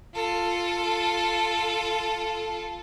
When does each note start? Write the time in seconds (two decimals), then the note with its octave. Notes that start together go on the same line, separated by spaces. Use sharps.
0.15 F4 A4